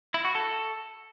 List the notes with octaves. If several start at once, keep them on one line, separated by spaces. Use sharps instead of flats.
E4
F#4
A4